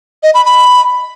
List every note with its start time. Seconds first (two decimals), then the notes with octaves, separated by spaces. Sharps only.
0.23 D#5
0.34 B5
0.45 B5